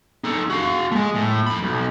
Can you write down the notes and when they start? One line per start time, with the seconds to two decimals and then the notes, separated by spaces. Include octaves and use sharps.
0.24 D#4 A4
0.50 F#4 F5
0.92 G#3 A3
1.15 A2
1.47 F2 B5
1.62 B1